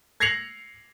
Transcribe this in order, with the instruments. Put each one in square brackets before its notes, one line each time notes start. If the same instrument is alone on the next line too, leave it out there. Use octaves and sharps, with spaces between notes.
[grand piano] G#6 A#6 C7 C#7 F7 F#7